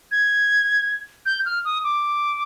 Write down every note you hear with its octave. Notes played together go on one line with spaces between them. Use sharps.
G#6
G6
F6
D#6
D6